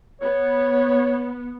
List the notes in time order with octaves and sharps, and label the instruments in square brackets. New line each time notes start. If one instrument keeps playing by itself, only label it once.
[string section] B3 [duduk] C#5